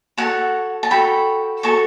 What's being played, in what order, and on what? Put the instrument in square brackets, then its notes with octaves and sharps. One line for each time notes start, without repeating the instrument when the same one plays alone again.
[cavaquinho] F#4 A4 C#5 F#5 A5
A5
F#4 A4 C#5 G5 B5
F#4 A4 C#5 A5 C#6